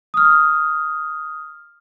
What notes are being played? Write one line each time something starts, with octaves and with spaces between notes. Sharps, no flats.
D#6 F6